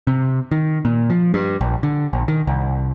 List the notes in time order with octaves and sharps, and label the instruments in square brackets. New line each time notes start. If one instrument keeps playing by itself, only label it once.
[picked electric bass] C3
D#3
A#2
F3
G2
A#1
D3
A#1
D#3
C2